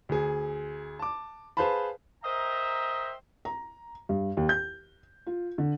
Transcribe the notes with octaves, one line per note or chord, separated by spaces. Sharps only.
D2 G#4
A5 D6
G#4 B4 C5 F5 A5 B5
A#4 C5 D#5 E5 G5 A#5
A#5
G2
D#2
G6
F4
D3